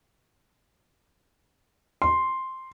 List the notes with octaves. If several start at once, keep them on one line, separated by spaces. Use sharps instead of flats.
C6